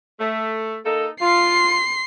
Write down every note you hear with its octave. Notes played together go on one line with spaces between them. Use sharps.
A3
A#3 D#4 A4
F4 C6 C7